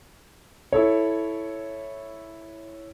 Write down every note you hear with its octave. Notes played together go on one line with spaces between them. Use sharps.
E4 A4 C#5